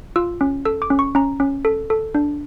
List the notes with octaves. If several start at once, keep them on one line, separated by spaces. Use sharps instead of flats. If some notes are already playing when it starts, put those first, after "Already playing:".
F4 E6
C#4
A4 E6
D6
C#4
C#6
C#4 A#5
C#4
A4
A4
D4